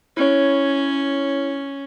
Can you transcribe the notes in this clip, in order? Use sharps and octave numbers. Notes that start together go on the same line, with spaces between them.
C#4 E4 C#5